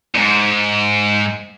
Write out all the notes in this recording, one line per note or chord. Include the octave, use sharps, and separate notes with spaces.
E2 G#2